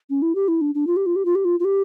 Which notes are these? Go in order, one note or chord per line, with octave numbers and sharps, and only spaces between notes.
C#4
E4
G4
E4
D4
D4
F4
G4
F4
G4
F4
G4
F4
F4
G4